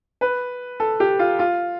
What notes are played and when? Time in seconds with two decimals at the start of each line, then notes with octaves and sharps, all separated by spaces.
0.21 B4
0.80 A4
1.00 G4
1.19 F4
1.39 F4